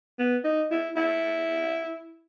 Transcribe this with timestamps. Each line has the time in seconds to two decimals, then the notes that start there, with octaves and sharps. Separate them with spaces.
0.19 B3
0.44 D#4
0.71 E4
0.96 E4